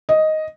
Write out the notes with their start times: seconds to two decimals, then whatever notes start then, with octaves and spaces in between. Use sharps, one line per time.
0.09 D#5